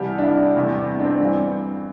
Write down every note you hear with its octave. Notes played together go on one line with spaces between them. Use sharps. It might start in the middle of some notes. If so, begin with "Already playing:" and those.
Already playing: C2 C3 E3 G3 G4
D4
E4
E2 C3 E3 G3
D4
C4
G2 E3 G3